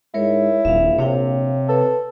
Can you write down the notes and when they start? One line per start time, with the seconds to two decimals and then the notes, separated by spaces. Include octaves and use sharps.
0.14 G#2 G#3 E4 A#4 C#5
0.65 D#1 A#1 E5 F5
0.98 C3 C#5 F5 G5
1.69 A4 B4